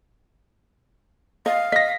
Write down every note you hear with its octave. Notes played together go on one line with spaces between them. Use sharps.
D#5 F5
D#5 A#6 B6